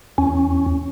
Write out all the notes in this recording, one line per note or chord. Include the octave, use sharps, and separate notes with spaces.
E2 C#4